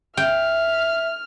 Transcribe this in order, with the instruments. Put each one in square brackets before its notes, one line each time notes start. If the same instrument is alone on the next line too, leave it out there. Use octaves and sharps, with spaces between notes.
[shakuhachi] E5 [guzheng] G5 [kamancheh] F6